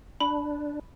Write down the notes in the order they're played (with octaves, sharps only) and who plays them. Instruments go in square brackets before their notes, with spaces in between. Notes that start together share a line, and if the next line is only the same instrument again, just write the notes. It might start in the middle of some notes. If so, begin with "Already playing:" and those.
[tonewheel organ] D4 [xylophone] B5